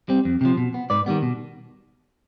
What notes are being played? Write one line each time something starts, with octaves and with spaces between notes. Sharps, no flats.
G3 C4
F2
C3 F3
B2
B3
G#2 B4 D5
D#3 G3 B3
B2